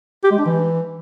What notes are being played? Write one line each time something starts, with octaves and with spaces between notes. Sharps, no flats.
G4
G#3
D4
E3